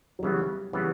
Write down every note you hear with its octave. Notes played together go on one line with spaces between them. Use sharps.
F#3
C#3 E3 G3 B3
C#3 E3 G3 B3